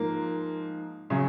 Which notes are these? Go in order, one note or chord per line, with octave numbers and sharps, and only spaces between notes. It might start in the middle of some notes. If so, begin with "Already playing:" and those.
Already playing: G#2 F3 A#3
C#3 F#3